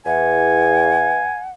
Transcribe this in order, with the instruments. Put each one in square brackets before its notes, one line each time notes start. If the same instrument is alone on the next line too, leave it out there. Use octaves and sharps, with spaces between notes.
[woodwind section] E2 [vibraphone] B4 E5 [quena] F#5 [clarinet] G#5